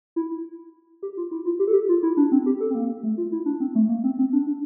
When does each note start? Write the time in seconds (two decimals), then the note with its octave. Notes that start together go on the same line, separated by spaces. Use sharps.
0.16 E4
1.03 G4
1.17 F4
1.31 E4
1.46 F4
1.59 G4
1.67 A4
1.74 G4
1.89 F4
2.03 E4
2.17 D4
2.32 C4
2.46 G4
2.61 A4
2.70 C4
2.75 A#3
3.03 A3
3.18 F4
3.32 E4
3.46 D4
3.60 C4
3.75 A3
3.89 A#3
4.04 C4
4.18 C4
4.33 D4
4.47 D4